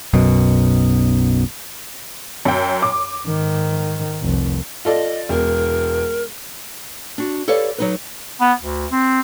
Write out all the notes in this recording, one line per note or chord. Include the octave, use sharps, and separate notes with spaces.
B1 F#2 B2
F#2 G5
D6
G#2 D#3
F1 C2
F4 A4 D5 D#5
E1 A#4
D4 F#4
G4 A4 B4 C#5 D5 F5
F#3 D#4 B4
B3
D2
C4